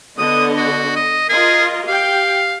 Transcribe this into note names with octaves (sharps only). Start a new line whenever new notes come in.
D3 B3 D#5 D#6
F#4
D#5
F4 G#4 A#4 D#5
G4 F5 G5